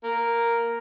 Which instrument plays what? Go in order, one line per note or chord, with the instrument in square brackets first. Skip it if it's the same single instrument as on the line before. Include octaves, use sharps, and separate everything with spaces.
[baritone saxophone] A#3